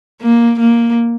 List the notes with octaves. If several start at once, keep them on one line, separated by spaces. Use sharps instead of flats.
A#3
A#3